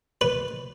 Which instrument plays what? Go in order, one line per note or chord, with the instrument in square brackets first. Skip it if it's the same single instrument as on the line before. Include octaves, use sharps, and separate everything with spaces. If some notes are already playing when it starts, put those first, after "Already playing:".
[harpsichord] B4